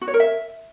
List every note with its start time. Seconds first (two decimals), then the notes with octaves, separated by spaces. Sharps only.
0.01 F#4
0.08 C#5
0.14 A#4
0.20 E5